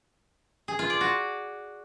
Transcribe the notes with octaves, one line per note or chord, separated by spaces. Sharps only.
G#4
F4
D5
F#4